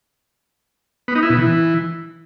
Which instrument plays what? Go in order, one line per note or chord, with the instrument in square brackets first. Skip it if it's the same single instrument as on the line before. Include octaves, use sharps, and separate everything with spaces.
[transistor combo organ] B3
D#4
E4
B2
E3